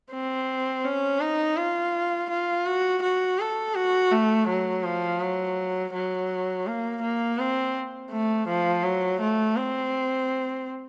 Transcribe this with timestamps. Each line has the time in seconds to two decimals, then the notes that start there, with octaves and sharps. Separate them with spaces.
0.11 C4
0.85 C#4
1.20 D#4
1.57 F4
2.30 F4
2.66 F#4
3.02 F#4
3.39 A4
3.75 F#4
4.12 A3
4.48 F#3
4.84 F3
5.21 F#3
5.94 F#3
6.67 A#3
7.02 A#3
7.39 C4
8.11 A3
8.48 F3
8.84 F#3
9.20 A3
9.56 C4